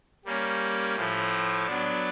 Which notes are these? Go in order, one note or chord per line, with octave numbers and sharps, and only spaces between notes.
G3 A#3 C#4
A2 F3 A3
F#3 B3 D4